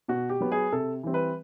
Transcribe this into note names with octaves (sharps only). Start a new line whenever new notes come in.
B2 F#4
G4
F#3 B3
G#4
C3 A4
E3 G3 C4
B4